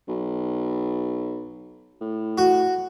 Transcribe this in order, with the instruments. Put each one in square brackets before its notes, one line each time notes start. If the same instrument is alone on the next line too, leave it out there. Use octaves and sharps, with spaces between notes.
[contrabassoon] B1
A2
[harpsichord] F#4